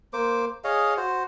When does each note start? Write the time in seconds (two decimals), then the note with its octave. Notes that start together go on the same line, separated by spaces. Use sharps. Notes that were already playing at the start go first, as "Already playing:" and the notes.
0.13 A#3 C5 D6
0.64 G#4 C#5 D#5 F5
0.97 F#4 C5